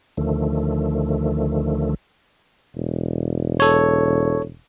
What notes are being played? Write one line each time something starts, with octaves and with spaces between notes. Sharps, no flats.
D2 D3 D#3 F3 A3
E1
A4 C#5